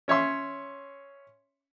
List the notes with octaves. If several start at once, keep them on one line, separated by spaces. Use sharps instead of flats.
C#4 C#5 E5 C6